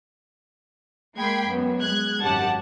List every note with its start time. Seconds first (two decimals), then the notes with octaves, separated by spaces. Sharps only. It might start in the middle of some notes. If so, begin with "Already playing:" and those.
1.17 G#3 A#3 G5 B5 G#6 C7
1.47 F#2 B3
1.81 G#3 F#6 G#6
2.23 G#1 F#2 G4 F#5 A5